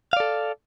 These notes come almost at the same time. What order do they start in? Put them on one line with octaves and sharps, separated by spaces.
F5 D5 A4